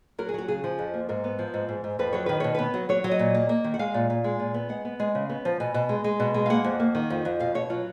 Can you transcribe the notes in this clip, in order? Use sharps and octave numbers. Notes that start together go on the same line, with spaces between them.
F#3 A#4
G#4
F#3 F#4
C#3 G#4
F3
F2
A#3
G#2 A#4
B3
F3
G#2
G#2
G#2
F2 B4
F#3 C#5
D#3 B4
B2 C#5
B3 B4
F#3
F#3 C#5
F#3
D#5
A#2
A#3
A#3
D#3
F#5
G#3 F5
A#2
A#2
G#3
A#2
B3
G#3 F#5
B3
G#3
C#3
B3
F3
B2 G#5
B2
G#3
G#3
B2
G#3
F5
A#3 F#5
F2
A#3
D#3
F2
F2
B2 F5
B2 C#5
F#3 F4